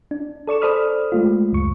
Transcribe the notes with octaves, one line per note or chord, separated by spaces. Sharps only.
D4
A4 D5 C#6 E7
A4 C5 D5 B5 D#6 F6
G#3 A3 F4
C#2 F#2 C#6